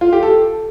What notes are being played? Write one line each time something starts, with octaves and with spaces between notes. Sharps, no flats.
F4
G4
A4